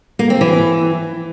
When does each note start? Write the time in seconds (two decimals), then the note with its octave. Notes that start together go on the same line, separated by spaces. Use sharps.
0.19 A#3
0.30 C4
0.41 E3